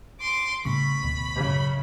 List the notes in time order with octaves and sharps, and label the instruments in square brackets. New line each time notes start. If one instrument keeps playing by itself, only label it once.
[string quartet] C6 D6
[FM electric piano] A2 C#6 [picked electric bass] C#3 G3 [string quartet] B5
[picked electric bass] D2 B2
[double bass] F#2 C#3